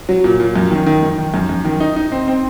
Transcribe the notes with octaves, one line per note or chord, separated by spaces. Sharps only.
F#3
A#2
A#2
F#2
D#3
D#3
F#2
D#3
F#2
F#2
D#3
D#4
D#4
C4
C4